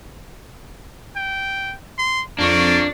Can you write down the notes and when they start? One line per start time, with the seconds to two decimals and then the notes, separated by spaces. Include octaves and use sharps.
1.16 G5
1.98 C6
2.39 F2 A#3 D4 C#6 A6